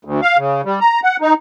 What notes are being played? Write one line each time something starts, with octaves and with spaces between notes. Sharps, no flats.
D2
F5
C#3
G3
A#5
F#5
D#4